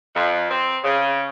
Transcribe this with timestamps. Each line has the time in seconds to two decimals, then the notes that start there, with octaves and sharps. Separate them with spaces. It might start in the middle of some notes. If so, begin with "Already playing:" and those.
0.15 F2
0.51 C4
0.84 C#3